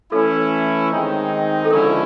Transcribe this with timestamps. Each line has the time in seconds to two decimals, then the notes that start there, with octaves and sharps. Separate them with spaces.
0.11 E3 A3 C#4 E4 A4
0.91 D#3 G#3 C4 D#4
1.65 A4
1.71 D3 F3 G#3 C#4 E4 A#4